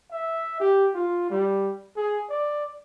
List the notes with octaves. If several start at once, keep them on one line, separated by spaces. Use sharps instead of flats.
E5
G4
F4
G3
G#4
D5